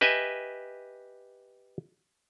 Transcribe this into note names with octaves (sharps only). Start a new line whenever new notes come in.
G4 B4 D#5 E5 G#5